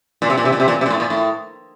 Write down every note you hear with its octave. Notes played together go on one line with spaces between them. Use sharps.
A#2
C3
A#2
C3
A#2
C3
A#2
C3
A#2
A2
A#2
A2